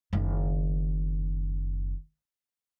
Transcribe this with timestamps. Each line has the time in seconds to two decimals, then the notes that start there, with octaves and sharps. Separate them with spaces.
0.13 F#1 D#3